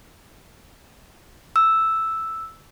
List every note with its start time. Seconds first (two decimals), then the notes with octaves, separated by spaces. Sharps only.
1.56 E6